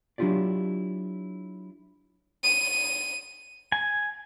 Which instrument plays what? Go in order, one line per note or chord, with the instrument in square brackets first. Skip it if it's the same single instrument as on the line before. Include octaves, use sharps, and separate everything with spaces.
[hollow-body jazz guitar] F#3 D4 E4 F4 G4 D5
[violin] D#7
[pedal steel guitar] G#5